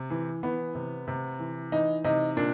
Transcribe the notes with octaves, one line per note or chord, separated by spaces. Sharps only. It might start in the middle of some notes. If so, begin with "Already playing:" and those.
Already playing: C3
E3
E3 B3
C3
C3
E3
E3 D#4
C3 D#4
A#2 D4